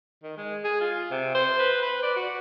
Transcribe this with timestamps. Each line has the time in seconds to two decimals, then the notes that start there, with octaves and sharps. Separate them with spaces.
0.23 D#3
0.37 G#3
0.64 G#4
0.81 F4
1.11 C3
1.35 C5
1.59 B4
1.82 B4
2.03 D5
2.16 F#4